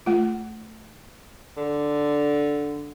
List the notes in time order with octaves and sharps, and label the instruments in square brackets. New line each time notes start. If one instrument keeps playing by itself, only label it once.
[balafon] A3 F4
[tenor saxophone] D3